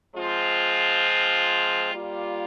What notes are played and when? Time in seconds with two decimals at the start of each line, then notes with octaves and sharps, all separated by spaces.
0.13 F3 G#3 C4 F4
1.91 G3 A#3 F4